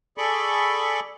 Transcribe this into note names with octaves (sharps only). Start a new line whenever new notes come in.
G#4 A4 D5 B5 C#6